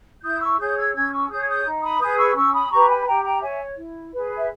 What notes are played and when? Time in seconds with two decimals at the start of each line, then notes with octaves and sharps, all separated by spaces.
0.23 E4 D#6 G6
0.40 C#6 E6
0.58 G#4 C#5 D#6 G6
0.76 E6 G#6
0.94 C#4 E6 G#6
1.11 C#6 E6
1.29 G#4 C#5 D#6 G6
1.41 G#6
1.47 D#6 G6
1.65 D#4
1.82 B5 D#6
2.00 G#4 B4 D#6 G6
2.18 C#6 E6
2.35 C#4 C#6 E6
2.53 B5 D#6
2.70 G4 B4 A#5 C#6
2.88 G#5 B5
3.06 G4 G5 A#5
3.23 G5 A#5
3.41 C#5 E5 G#5
3.76 E4
4.12 G#4 B4
4.37 E5